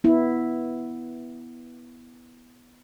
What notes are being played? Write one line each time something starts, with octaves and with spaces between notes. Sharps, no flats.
B3 E4